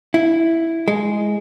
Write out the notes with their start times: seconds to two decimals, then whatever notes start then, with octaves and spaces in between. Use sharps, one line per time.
0.14 E4
0.88 G#3